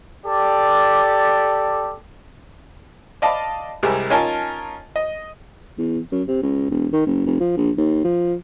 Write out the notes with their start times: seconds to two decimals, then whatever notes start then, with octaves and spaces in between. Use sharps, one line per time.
0.25 G4 A4 D5
3.22 D5 D#5 F5 A5 B5 D6
3.83 C2 G3 G#3 A#4 G#5 A#5
4.10 C#4 D#4 F4 A#4 G#5 A5
4.96 D#5
5.78 E2
6.12 F#2
6.27 C3
6.42 C#2
6.70 E1
6.93 D#3
7.06 F#1
7.26 F1
7.40 F3
7.57 A#1
7.77 D#2
8.04 F3